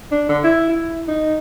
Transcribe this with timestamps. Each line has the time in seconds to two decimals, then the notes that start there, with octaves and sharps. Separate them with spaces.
0.11 D4
0.29 D3
0.44 E4
0.69 E4
1.08 D#4